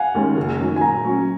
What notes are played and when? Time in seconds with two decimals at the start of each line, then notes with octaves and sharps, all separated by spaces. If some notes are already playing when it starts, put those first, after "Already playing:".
Already playing: F5 F#5 G#5
0.14 D#2 D#3 G#3 C#4
0.37 F#1
0.59 F#2 D#3 F#3 C#4
0.76 G#5
0.81 A#2 A#5
1.04 F#3 C#4